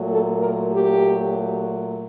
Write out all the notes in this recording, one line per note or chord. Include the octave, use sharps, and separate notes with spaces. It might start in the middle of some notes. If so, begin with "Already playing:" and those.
Already playing: A#2 F#3 A3
A4
A#4
G4